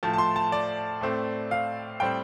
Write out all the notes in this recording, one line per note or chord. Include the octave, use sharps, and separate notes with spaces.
A2 F3 A3 A5
A5
C6
A5
D5
A2 A3 C4
F5
A2 G3 C4 G5